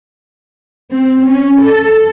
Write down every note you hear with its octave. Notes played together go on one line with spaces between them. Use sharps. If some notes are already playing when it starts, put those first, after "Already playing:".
C4
C#4
A4